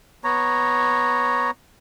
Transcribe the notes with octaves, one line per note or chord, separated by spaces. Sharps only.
B3 C#5 A#5